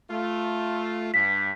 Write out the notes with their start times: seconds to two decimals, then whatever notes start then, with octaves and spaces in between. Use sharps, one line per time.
0.11 A3 F4
1.14 G2 B6